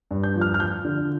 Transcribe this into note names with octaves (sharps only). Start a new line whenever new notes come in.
G2
G6
F3
F6
F6
F3 G6
D3